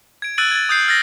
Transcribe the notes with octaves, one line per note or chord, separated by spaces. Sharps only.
G#6 D7
E6 F#6 A6 D7 D#7 F#7
G#6 A6
D#6 G6 C7
F6 A6 A#6